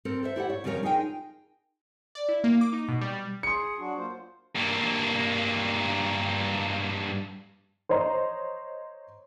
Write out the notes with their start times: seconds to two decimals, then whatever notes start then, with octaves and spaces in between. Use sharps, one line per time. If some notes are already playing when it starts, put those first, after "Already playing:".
0.05 C4 A4 A#4
0.23 A4 C5 E5
0.36 E4 G4 A4 F#5
0.50 C#5
0.64 F2 C#3 G3 D#4 A#4 C#5
0.83 D#4 F4 G#4 A#4 F#5 G5
2.15 D5
2.29 E4
2.44 A#3
2.61 D6
2.73 D#4
2.88 B2
3.01 G3
3.13 G3
3.43 G#4 C6 C#7
3.78 F#3 D4 F#4
3.97 A#3 F4 C5
4.56 G2 A#3
7.89 C5 C#5 D#5 A#5 C6